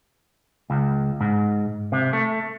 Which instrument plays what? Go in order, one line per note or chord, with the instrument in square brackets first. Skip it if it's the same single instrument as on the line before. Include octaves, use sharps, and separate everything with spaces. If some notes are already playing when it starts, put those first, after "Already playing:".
[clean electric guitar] C#2
G#2
C3
A3